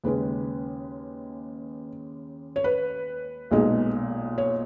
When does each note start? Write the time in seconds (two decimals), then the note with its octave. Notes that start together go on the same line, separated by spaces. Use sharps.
0.04 D#2 C#3 G#3 C#4 B4
2.56 C#5
2.64 B4
3.51 B1 A#2 G#3 D#4
4.38 C#5